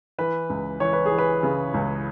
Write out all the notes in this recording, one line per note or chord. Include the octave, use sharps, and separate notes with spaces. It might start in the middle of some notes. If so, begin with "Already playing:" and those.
E3 B4
C#2
E3 C#5
B4
G#4
E3
B4
C#3
C#2